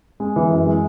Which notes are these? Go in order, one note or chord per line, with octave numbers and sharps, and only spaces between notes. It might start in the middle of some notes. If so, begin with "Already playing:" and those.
G#3
E3
F#2
G#3